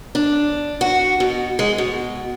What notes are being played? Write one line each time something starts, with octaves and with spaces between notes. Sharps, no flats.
D4
F#4
B2
G#3
B2